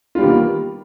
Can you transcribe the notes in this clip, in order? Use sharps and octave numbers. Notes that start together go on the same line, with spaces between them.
D#3 G3 A#3 B3 F4